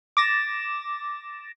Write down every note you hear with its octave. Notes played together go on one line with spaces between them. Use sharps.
D6 A6 A#6 E7